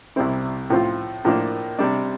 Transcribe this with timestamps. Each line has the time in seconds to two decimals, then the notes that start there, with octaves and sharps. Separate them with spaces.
0.16 C2 C3 G3 C4 E4
0.70 A2 F3 C4 F4
1.25 A2 F3 A#3 D4
1.79 C3 G3 D4